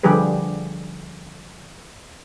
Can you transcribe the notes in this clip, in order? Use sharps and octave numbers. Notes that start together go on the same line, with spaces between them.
D3 F3 G3 G4 G#4 B4